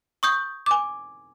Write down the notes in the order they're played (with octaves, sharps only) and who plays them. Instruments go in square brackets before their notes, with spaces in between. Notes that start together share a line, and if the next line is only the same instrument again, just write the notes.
[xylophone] C#6 D#6 G6
[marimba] G#5 D6